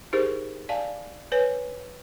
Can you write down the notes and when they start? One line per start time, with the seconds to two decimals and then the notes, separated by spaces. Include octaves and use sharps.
0.13 D#4 E4 G4 G#4 A#4 C5
0.69 D5 F5 G#5 A5
1.32 B4 C#5 G#5